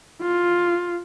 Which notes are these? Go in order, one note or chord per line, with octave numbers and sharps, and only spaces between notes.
F4